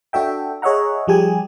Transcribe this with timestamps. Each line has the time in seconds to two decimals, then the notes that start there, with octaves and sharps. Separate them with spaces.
0.13 D4 F#4 A4 E5 G5
0.62 G#4 C#5 D#5 E5 F#5 A#5
1.07 F3 G3 G4 G#4 G#5